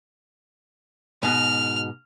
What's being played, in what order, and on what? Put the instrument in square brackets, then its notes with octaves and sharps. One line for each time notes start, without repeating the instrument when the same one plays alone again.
[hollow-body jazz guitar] G#2 B2 [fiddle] F6